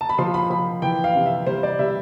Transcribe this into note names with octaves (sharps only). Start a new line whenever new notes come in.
A5
B5
F3 C6
B5
F3 B5
E3 G5
F5
C3
E5
G3 C5
D5
G3 E5